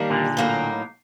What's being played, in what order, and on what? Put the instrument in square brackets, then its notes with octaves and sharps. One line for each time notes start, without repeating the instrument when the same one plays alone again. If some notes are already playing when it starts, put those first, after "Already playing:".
Already playing: [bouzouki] D#3 G3 A#3 D4
[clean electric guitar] A#2 D3
[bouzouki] A2 F#3 A#3 D#4